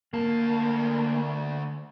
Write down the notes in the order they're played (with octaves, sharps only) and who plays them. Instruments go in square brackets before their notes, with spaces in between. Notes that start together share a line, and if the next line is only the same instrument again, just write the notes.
[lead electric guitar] D2 A5 [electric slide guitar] A#3